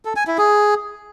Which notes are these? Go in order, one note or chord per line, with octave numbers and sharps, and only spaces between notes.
A4
G#5
E4
G#4